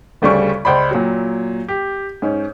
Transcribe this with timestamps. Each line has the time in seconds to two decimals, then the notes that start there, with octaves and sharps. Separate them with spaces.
0.22 G1 D2 C#3 G3 D5 C#6
0.65 C#2 C5 D5 B5
0.91 A#2 F#3
1.68 G4
2.22 G#2 C#4